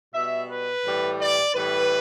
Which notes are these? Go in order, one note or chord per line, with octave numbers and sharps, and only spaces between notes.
B2 G3 E5
B4
A2 E3 G3
D5
A2 E3 G3 B4